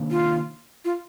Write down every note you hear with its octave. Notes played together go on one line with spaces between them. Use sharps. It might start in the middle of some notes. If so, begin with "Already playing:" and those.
Already playing: C3 D#3 A#3 D4
F4
F4